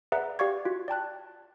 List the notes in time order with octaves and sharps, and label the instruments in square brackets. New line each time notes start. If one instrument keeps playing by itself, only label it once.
[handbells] G#4 B4 D5 E5 F#5 A#5
G4 D5 F5 C#6 G#6
F4 F#4
D5 G5 A5 F#6